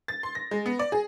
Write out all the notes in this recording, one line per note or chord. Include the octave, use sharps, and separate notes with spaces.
A6
C6
A#6
G#3
B3
D5
G#4